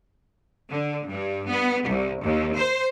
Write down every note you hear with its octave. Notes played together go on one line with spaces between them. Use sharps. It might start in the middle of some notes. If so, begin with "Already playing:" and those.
D3
G2
B3
C2
D#2
C5